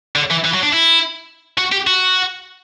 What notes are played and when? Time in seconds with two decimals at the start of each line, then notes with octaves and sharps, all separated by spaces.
0.15 D3
0.30 E3
0.44 E3
0.53 F#3
0.63 D4
0.73 E4
1.58 F#4
1.72 G4
1.87 F#4